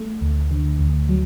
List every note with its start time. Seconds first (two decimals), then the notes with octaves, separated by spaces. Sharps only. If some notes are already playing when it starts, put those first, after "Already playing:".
Already playing: A3
0.21 D2
0.51 D3
0.79 D2
1.09 F#3